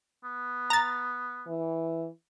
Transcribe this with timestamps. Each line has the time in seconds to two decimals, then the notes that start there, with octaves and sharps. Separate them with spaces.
0.24 B3
0.70 A#5 A6
1.47 E3